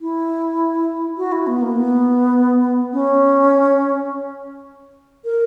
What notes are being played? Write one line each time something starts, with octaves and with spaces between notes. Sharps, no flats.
E4
F#4
E4
B3
A#3
B3
C#4
A#4